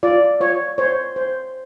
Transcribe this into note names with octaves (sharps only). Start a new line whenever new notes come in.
F4 D5
F4 C#5
C5 C#5
C5